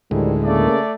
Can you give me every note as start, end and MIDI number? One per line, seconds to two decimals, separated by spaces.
0.11 0.69 38
0.11 0.69 45
0.11 0.33 51
0.11 0.33 53
0.11 0.33 55
0.11 0.69 56
0.44 0.77 49
0.44 0.94 57
0.44 0.77 58
0.44 0.94 74